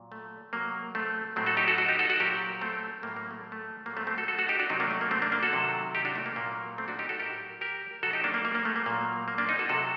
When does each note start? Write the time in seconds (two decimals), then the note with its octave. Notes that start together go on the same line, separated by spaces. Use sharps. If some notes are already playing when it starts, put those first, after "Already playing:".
Already playing: A#2 F#3
0.12 A3
0.53 C3 F#3 A#3
0.95 A3 C4
1.36 A2 F#3 A3 C4
1.46 F#4 A4
1.57 D#4 G4
1.68 F#4 A4
1.78 F#4 A4
1.88 D#4 G4
1.99 F#4 A4
2.10 F#4 A4
2.20 A#2 F#3 G4 A#4
2.61 A3 C4
3.03 A2 F#3 A#3
3.16 A#3
3.31 A3
3.52 A3
3.86 A#2 F#3 A#3
3.97 A3 C4
4.07 A3 C4
4.18 F#4 A4
4.28 F#4 A4
4.39 F#4 A4
4.49 D#4 G4
4.59 D4 F#4
4.69 C3 D#3 F#3 C4 D#4
4.80 A#3 D4
4.91 A3
5.01 A#3
5.11 A3 C4
5.22 A#3 D4
5.32 A#3 D4
5.43 F#4 A4
5.53 C3 D#3 F#3
5.95 D#4 G4
6.05 D4 F#4
6.15 A3
6.26 A#3
6.36 A#2 F#3 A#3
6.78 A3 C4
6.88 D4 F#4
6.99 D#4 G4
7.09 F#4 A4
7.19 A2 F#3 G4 A#4
7.61 G4 A#4
8.02 C3 D#3 F#3 F#4 A4
8.13 D#4 G4
8.24 A#3 D4
8.34 A#3
8.45 A#3
8.55 A#3
8.65 A3
8.76 A#3
8.86 A#2 F#3 A#3
9.28 A#3
9.38 A#3 D4
9.49 C4 D#4
9.59 F#4 A4
9.69 C3 F#3 F#4 A4